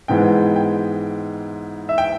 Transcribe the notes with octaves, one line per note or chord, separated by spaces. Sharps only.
G#2 E3 G#3 B3 G5
G5
E5
G5